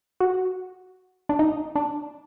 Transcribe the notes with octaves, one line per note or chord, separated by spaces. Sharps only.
F#4
D4
D#4
D4